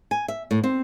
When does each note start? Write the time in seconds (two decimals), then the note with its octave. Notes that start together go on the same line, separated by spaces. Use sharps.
0.11 G#5
0.28 E5
0.51 A2
0.64 C4